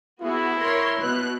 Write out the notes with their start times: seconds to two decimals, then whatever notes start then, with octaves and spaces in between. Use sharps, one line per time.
0.21 B3 E4 F#4 G#4
0.59 A#4 C#5 C6
1.00 B2 B3 F#6